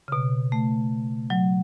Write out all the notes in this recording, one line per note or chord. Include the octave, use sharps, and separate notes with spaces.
C#3
B2
A3
F#3